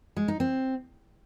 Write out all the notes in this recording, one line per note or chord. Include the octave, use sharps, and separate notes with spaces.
G#3
D#4
C4